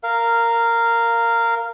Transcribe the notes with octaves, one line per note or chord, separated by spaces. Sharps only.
A#4 F5